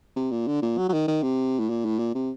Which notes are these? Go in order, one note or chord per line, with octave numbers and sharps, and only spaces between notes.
C3
A#2
D3
A#2
F#3
F#3
D#3
D#3
C3
A2
A#2
A2
A#2
C3